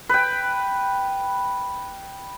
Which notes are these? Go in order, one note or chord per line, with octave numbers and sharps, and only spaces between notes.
B4 G5